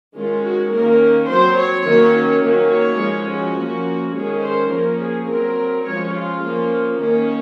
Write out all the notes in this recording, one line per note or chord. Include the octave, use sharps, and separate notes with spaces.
D#3 G#3 C#4 F4
F#4
D#3 A#3 C#4 A#4
F#3 C4 C5
C#5
D#3 F#3 A#3 C#4
D#3 F#3 A#3 C#4
C#5
F3 G#3 C#4
F#4
F3 A#3 C#4
D#3 G#3 C#4 G#4
C5
F3 A#3 C#4 A#4
G#4
F#3 C4 A#4
F3 G#3 C#4 C#5
F4
F3 A#3 C#4
D#3 A#3 C#4